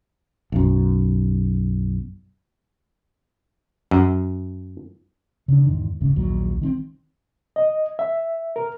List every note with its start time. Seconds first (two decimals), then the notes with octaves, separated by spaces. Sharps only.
0.52 B1 F#2
3.91 F#2
5.48 C#3 D4
5.66 E2 G#2 D#3
6.01 D#1 G#1 G#2 C#3
6.16 A#1 D#2 F#3
6.62 D#3 A3 C4
7.56 D#5
7.99 E5
8.56 A#4